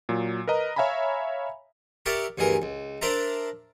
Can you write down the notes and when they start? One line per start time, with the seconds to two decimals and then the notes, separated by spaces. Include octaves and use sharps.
0.09 A#2 F#3
0.48 A#4 B4 D#5 A#5
0.76 C#5 E5 F5 G#5 A#5 B5
2.06 G4 A#4 C#5 D5 E5
2.38 D2 G2 E3 G#4 A#4
2.62 C#2
3.01 D4 A#4 C5 D5 E5 A#5